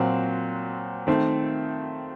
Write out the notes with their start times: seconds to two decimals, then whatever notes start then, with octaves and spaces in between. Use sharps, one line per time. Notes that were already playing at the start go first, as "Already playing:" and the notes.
Already playing: A#2 F#3 C4 F#4
1.07 D#3 A3 C4